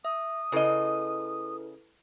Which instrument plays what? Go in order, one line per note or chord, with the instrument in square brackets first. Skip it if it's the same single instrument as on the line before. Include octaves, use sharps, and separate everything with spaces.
[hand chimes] E5 [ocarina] D#6
[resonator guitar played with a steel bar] C#3 D#5 [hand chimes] E4 A4 B4